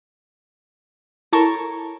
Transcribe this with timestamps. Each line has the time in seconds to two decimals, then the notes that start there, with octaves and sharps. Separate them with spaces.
1.33 E4 A4 A#4 C#5 A5 C#6